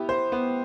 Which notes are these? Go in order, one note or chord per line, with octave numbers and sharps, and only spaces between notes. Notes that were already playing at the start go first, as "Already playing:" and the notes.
Already playing: B3 E4 G4
C5
B3